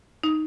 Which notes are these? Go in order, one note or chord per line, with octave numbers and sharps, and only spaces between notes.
D#4